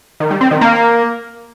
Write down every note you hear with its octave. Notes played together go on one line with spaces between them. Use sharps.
D#3
G3
C4
D#3
A#3